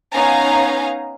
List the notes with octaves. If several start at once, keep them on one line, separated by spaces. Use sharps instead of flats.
B3 C#4 D#4 F5 G#5 A#5